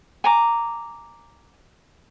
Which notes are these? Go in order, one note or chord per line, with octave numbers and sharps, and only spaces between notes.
G#5 A#5 D6